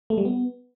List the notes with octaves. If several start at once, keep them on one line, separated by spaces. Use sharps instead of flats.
A3
G3
B3